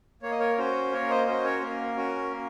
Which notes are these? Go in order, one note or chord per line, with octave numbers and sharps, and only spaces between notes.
A#3 C#5
D#5
A#4 C#5
C#4 F#4 C5
A#3 A#4 C#5
C5 D#5
C#4 F#4 C5 D#5
A#4 C#5
A#3 A#4
C#4 F#4
A#3